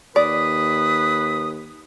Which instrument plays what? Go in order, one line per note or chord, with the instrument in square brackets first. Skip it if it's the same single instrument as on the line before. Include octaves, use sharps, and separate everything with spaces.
[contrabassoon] D#2 [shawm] B4 [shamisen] D5 [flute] D#6